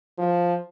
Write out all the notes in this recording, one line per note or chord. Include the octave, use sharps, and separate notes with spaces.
F3